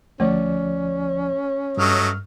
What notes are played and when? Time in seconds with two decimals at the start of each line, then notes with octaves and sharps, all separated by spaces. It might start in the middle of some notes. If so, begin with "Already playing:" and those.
0.20 D2 F3 A3 C#4 D5
1.77 G2 F#3 A3 D#5 F6